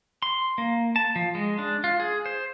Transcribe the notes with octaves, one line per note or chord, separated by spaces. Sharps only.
C6
A#3
A5
F3
G#3
D4
F4
G#4
C5